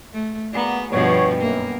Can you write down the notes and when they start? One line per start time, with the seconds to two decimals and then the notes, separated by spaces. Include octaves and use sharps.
0.13 A3
0.54 A#3 B3 F#4 G#4 D5 A#5 B5
0.91 G2 B2 F3 B3 G4 C#5
1.41 F#2 A#3